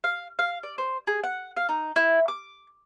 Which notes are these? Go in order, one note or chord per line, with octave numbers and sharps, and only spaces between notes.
F5
F5
D5
C5
G#4
F#5
F5
D#4
E4
D6